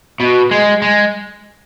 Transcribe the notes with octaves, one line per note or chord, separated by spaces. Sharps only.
B2
G#3
G#3